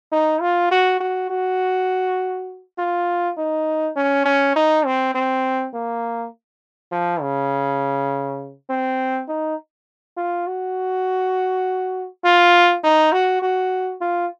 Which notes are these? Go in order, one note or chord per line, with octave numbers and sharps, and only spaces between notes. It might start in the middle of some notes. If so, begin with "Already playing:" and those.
D#4
F4
F#4
F#4
F#4
F4
D#4
C#4
C#4
D#4
C4
C4
A#3
F3
C#3
C4
D#4
F4
F#4
F4
D#4
F#4
F#4
F4